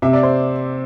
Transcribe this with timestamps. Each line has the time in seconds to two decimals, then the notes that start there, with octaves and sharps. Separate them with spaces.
0.02 C3 E5
0.13 D5
0.23 C5